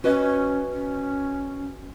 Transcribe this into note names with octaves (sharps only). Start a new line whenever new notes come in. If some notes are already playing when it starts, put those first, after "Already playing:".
C#4 F#4 B4 D#5
C#4